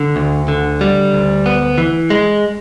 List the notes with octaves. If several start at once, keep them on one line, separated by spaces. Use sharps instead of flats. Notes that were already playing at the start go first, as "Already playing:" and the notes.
Already playing: D3
D2
D3
G3
D2
B3
E3
G#3